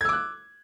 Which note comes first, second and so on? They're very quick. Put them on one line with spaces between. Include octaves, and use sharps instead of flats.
G#6 E6 D6 F#6